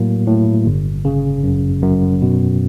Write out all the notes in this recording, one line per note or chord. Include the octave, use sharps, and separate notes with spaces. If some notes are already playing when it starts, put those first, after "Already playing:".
Already playing: A2 F#3 A#3
A2
G1
C#3
F#2
F#2
B2